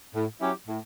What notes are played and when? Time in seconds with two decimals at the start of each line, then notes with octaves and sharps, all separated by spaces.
0.14 A2
0.41 F#3 C#4 E4 G4
0.68 A2